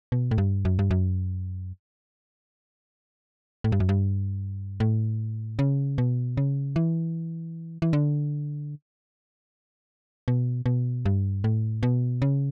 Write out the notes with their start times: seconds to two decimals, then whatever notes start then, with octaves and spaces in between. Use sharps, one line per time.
0.12 B2
0.31 A2
0.38 G2
0.65 F#2
0.79 G2
0.91 F#2
3.64 A2
3.72 G2
3.80 F#2
3.89 G2
4.80 A2
5.59 C#3
5.98 B2
6.37 C#3
6.76 E3
7.82 E3
7.93 D3
10.28 B2
10.66 B2
11.05 G2
11.44 A2
11.83 B2
12.22 C#3